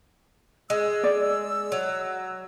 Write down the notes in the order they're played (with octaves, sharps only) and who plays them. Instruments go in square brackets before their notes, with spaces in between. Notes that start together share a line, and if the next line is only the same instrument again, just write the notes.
[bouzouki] G#3 [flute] E6
[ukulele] D5
[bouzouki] F#3